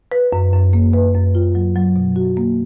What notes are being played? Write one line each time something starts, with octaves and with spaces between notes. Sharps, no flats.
B4
F#2
F#2
A#3
B4
F#2
F4
F#3
F#3
B2
F#4
A#3